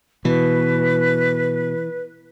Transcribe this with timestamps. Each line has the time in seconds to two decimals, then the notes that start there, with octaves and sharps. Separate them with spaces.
0.25 B2 E3 B4